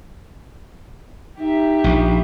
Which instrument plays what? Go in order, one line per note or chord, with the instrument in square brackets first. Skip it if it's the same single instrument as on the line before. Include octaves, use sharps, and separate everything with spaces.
[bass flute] D#4 [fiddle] G4 E5
[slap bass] A#1